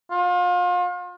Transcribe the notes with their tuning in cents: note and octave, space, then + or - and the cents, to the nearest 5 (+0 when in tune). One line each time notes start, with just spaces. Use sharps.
F4 +35